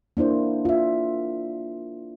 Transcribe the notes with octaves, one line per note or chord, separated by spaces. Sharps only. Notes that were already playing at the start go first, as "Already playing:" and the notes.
A#3 D4 E4 C5
F4 E5